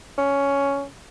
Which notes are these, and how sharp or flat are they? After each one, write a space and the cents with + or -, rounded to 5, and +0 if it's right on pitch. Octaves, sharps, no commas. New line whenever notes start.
C#4 +10